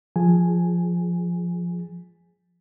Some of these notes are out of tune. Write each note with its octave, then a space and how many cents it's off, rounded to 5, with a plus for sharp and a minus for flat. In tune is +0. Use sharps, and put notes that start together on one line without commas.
F3 +0 G#4 +0 G#5 +0